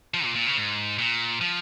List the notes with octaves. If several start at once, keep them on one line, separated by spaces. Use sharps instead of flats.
F3
A#2
A#2
C#3
G#2
A#2
F3